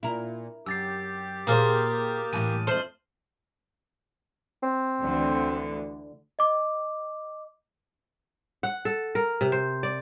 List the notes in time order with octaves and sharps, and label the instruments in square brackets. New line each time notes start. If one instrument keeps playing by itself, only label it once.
[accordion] A#2 [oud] E4 A#4
[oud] F#2 [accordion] G4 [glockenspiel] E6 A6 C7
[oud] A#2 G#4 C5 [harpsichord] A#3 [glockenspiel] D#6 F6 A6
[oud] A2 E3 [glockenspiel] A5 D#7
[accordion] F2 A3 [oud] A4 [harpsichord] C5 [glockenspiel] F6 F#7
[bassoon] C4
[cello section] D2 D3 E3
[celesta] D#5 D6
[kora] F#5
A4
A#4
C3
C5
D5